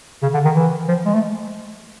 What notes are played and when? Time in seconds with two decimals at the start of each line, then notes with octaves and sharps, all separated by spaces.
0.22 C#3
0.34 D3
0.45 D#3
0.56 E3
0.88 F3
1.05 G#3
1.14 A3